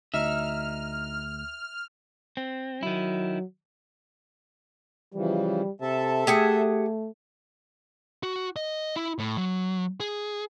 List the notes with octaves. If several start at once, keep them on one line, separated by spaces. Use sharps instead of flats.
D2 D#4 E5 F6
C4
D#3 F#3 E4
C#3 E3 F3 G3
C3 A4 E5 A5
A3 G4 G#4 F#5
F#4
D#5
E4
A2
F#3
G#4